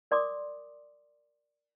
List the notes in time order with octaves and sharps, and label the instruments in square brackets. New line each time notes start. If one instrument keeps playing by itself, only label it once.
[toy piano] A#4 D5 C6 D6 D#6